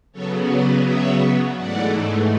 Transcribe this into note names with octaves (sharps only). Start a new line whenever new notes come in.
C#3 F#3 B3 A4 C#5
B4 D5
C#5 E5
G#2 E3 A3 D5 F#5